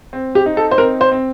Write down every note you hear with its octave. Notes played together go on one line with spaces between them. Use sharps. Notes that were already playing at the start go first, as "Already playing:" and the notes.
C4
G4
D#4
A4
C5
C4 A#4
C5
C4